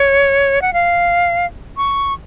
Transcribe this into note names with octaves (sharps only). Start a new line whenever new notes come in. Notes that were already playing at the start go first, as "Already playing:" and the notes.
Already playing: C#5
F#5
F5
C#6